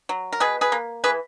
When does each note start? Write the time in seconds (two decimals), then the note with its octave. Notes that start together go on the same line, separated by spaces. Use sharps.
0.09 F#3
0.32 A#4
0.40 B2 G#4 B4
0.61 G#4 B4
0.72 A#3
1.04 E3 G#4 B4